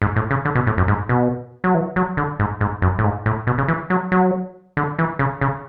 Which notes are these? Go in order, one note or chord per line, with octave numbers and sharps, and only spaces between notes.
G#2
A2
C#3
D3
B2
A2
F#2
G#2
B2
F#3
E3
F#3
D3
G#2
G#2
F#2
A2
G#2
A2
B2
C#3
E3
F#3
F#3
D3
E3
C#3
C#3